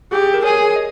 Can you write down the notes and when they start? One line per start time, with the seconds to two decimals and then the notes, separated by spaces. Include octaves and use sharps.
0.12 G4 G#4
0.22 G#4
0.34 A#4
0.44 G#4 A#4 C#5
0.76 D#5